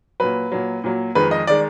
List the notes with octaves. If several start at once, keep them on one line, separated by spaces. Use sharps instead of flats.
A#2 F#3 B4
A#2 F#3
A#2 F#3
F2 D#3 G#3 B4
D#5
D#3 G#3 D5